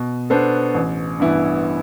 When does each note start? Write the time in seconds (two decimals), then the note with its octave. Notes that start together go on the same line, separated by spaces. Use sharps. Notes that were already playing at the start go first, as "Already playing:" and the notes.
Already playing: B2
0.30 B3 D4 A4 C5
0.74 A1
1.20 G2 E3 B3 E4